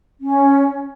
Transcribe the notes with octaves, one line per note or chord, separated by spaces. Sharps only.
C#4